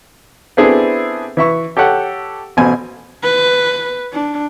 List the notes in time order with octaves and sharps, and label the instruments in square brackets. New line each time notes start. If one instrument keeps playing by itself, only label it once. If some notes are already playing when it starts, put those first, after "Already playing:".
[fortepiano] B3 C4 D4 E4 G#4 A4
E3 E5 C#6
G4 A4 C#5 F#5
A1 B2 C5 G#5
[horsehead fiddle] B4
D4